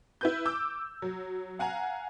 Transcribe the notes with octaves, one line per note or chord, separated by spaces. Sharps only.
E4 B4 G6
D6 E6 G6
F#3
F5 F#5 G#5 A#5